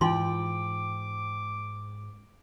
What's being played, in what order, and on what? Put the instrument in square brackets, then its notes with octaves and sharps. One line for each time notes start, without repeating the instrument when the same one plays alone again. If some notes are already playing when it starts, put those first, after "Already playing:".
[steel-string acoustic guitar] G#2 G5 [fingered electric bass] E3 [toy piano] D#4 F4 C6 [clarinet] D6